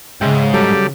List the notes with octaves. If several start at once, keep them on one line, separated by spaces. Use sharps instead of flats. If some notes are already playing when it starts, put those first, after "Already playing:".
G#2 C#3 G#3 E5 G5
F#3 G3 A4